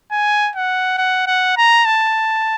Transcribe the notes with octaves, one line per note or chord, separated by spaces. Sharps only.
G#5
F#5
F#5
F#5
A#5
A5